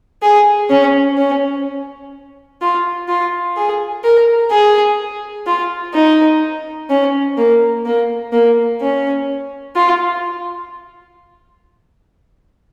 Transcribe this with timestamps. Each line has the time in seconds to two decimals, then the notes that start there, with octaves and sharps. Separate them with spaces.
0.23 G#4
0.70 C#4
1.18 C#4
2.62 F4
3.08 F4
3.57 G#4
4.04 A#4
4.51 G#4
5.47 F4
5.94 D#4
6.90 C#4
7.37 A#3
7.86 A#3
8.32 A#3
8.81 C#4
9.76 F4